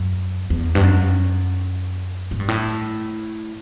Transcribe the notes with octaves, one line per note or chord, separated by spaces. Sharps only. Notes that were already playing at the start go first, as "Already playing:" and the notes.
Already playing: F#2
E2
G2
F#2
A2
G2
A2